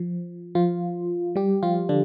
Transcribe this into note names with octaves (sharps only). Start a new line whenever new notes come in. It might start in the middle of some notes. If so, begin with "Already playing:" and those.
Already playing: F3
F3 F4
G3 G4
F3 F4
D3 D4